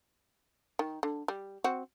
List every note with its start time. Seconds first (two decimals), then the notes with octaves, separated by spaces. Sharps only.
0.79 D#3
1.03 D3
1.28 G3
1.64 C4 F#4